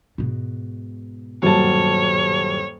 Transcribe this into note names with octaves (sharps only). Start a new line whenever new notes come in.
G#2 B2
D#1 G2 F#3 C#5 A5